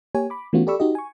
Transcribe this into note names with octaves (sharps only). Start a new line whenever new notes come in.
A#3 G4 C#5 G#5
B5 D6
E3 A3 B3 C#4 F4 F#4
G4 A4 D5 B5 C#6 E6
D#4 F#4 G4 D#5
G#5 C#6